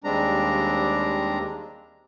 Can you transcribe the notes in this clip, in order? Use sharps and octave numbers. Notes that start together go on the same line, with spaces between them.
D#2 G3 G#3 C4 D4 A#5